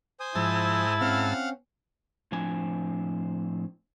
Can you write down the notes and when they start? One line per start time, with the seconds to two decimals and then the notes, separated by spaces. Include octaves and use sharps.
0.20 C5 G#5 D#6
0.35 G#2 F3 E4 A5 E6
1.01 C4 C#4 F5 F#5 F6
2.32 A2 F3 C4 D4 G#5